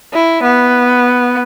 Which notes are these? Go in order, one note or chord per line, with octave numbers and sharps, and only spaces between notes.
E4
B3